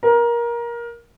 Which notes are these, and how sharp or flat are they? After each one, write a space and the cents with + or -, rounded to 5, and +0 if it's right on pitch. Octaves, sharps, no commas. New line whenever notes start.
A#4 +20